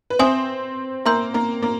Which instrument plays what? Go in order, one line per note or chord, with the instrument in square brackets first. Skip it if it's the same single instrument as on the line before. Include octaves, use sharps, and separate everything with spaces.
[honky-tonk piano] B4
[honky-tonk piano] C4 C5 [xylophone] E5 G#5 C6 D#6
[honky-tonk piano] A#3 A#4 [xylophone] E5 G#5 C6 E6 G6
[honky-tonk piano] A#3 A#4
A#3 A#4